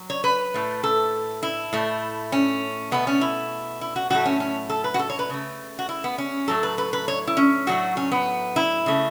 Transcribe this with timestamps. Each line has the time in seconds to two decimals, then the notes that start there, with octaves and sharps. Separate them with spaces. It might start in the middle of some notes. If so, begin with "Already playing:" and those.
Already playing: F#3
0.10 C#5
0.24 B4
0.54 A2 A3
0.83 A4
1.43 E4
1.73 A2 A3
2.32 C#4
2.92 B2 A3 B3
3.07 C#4
3.21 E4
3.81 E4
3.96 F#4
4.10 A2 F#3 A3 F#4
4.26 C#4
4.40 C#4
4.69 A4
4.84 B4
4.94 F#4
4.99 A4
5.10 C#5
5.19 B4
5.30 C#3 A3
5.79 F#4
5.89 E4
6.04 B3
6.18 C#4
6.48 A2 F#3 A3 A4
6.63 B4
6.78 B4
6.93 B4
7.08 C#5
7.27 E4
7.37 C#4
7.67 A2 F#3 A3 F#4
7.97 C#4
8.12 B3
8.56 E4
8.86 C#3 A3